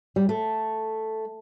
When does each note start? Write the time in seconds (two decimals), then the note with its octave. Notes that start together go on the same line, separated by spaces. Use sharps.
0.16 G3
0.29 A3